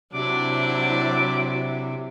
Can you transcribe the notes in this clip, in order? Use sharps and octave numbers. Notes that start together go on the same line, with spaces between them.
C3 F#3 D4 E4 C5 D6